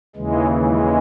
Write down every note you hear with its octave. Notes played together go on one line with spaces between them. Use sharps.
D#2 C#3 E3 G#3
G#3